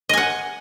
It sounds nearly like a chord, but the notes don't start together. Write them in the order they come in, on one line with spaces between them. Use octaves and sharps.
D#5 G#5 F#5